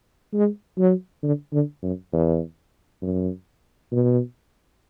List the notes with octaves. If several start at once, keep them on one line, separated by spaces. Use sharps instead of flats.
G#3
F#3
D3
D3
F#2
E2
F#2
B2